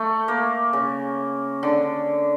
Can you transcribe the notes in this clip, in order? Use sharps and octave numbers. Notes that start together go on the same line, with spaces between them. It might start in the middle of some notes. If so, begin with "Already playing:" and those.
Already playing: A3
A#3
C#3
D3